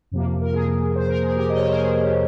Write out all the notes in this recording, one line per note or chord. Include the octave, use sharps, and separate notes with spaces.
F2 C3 F3 A#3
A#4
G#4
C5
A#4
G#4
G4 A#4
D#5
C#5
C5
A#4
G#4
G4